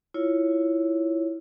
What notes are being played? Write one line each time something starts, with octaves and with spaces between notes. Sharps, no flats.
E4 F4 C#5